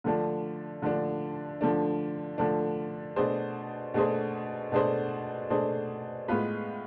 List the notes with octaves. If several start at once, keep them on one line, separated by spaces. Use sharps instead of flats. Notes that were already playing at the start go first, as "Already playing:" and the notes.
D3 F3 A3 D4
D3 F3 A3 D4
D3 F3 A3 D4
D3 F3 A3 D4
B2 A3 D4 G#4 C5
B2 A3 D4 G#4 C5
B2 A3 D4 G#4 C5
B2 A3 D4 G#4 C5
A2 G#3 B3 F4 B4